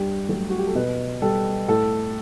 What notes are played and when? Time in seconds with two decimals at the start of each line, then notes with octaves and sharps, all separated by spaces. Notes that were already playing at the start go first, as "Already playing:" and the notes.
Already playing: G2 G4
0.29 F#3 A3
0.50 F#4
0.58 G4
0.67 A4
0.75 B2 B4
1.22 G3 A4
1.68 A2 A4